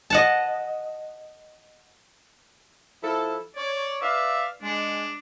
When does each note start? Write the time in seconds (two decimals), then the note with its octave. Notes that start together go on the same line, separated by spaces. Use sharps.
0.10 D#5 F#5 A5
3.03 F3 E4 A4
3.56 C#5 D5
4.02 B4 D5 E5 F5
4.62 G#3 D4